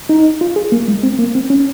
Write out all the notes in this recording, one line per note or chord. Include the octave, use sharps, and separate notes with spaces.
D#4
F4
G#4
A#3
G#3
C4
A#3
C4
C#4